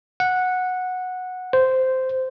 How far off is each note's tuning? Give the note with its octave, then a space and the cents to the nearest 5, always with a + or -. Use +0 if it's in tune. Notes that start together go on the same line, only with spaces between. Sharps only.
F#5 -10
C5 -10